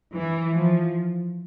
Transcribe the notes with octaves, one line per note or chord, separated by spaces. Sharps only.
E3
F3